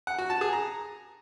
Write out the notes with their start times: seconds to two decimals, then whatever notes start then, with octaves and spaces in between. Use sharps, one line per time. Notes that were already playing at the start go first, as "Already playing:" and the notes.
0.07 F#5
0.18 F#4
0.30 A5
0.41 G#4
0.53 A#5